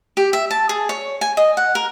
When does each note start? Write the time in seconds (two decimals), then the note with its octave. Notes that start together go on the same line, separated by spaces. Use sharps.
0.17 G4
0.33 E5
0.51 A5
0.69 G#4
0.89 C#5
1.21 G#5
1.37 D#5
1.57 F#5
1.75 A#4